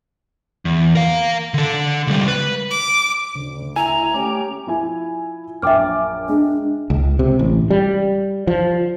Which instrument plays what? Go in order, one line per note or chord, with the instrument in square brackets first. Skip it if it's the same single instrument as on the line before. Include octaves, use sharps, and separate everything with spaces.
[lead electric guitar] E2
A#4 F5
D3 A4
C#2 G3
B4
[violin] D6
[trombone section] D2 [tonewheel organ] C#3
[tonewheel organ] E4 E5 [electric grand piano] G#5 [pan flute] A#5
[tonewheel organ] A3 D6 [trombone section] C#4 G4
[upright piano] F3 E4 G#5
[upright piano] A#1 F#2 D6 [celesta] E5 G5 F6
[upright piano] G#3 [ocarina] D4
[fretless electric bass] C#2
C3
A1
G3
F3